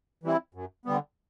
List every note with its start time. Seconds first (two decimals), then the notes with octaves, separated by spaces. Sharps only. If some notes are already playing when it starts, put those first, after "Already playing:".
0.23 E3 G3 C4 E4
0.54 F#2
0.85 D3 G3 B3